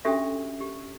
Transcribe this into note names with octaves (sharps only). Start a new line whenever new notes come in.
C#4 D4 F#4 G4 A4 E5
G4